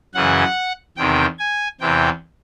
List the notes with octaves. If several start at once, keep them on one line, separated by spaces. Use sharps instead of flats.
F#2 C#3 E3 F#5
E2 C3 D#3 G5
G#5
E2 C3 E3 G5